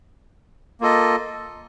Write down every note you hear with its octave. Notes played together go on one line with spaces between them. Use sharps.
A#3 F4 A4 D#5